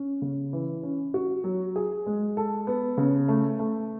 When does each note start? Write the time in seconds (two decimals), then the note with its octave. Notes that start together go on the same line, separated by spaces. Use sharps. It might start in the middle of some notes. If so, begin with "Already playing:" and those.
Already playing: C#4
0.22 C#3
0.53 E3
0.83 C#4
1.14 F#4
1.44 F#3
1.76 G#4
2.06 G#3
2.37 A4
2.67 B3
2.98 C#3
3.28 A3
3.59 A3